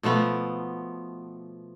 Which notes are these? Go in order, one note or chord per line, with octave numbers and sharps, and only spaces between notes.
B2 F3 A3 B3